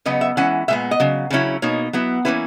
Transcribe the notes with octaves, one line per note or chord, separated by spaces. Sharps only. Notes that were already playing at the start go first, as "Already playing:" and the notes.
C#3 F#3 B3 D#5
E5
E3 G#3 C#4 E4 F#5
A#2 G#3 B3 E5
D#5
C#3 F#3
C#3 F#3 C#4 E4
B2 A#3 D#4 C#5
F#3 B3 E4
E3 A#3 C#4 E4 B4